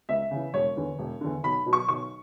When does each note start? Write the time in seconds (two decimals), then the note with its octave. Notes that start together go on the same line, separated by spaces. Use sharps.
0.09 C#2 E5
0.31 C#3
0.36 E3
0.53 E1 C#5
0.77 E2 D3
0.98 E1
1.21 E2 D3
1.44 B1 B5
1.66 B2 F#3
1.73 C#6
1.88 B1 C#6